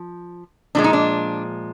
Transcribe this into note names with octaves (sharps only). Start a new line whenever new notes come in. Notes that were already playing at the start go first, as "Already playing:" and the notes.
Already playing: F3
A#2 F3 G#3 D4
D#4
D4